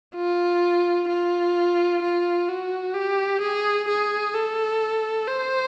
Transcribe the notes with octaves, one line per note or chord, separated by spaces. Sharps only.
F4
F4
F4
F#4
G4
G#4
G#4
A4
C5